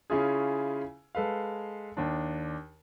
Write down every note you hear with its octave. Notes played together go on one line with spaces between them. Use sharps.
C#3 C#4 E4 F4 G#4
G#3 A4 B4 F5
D#2 D4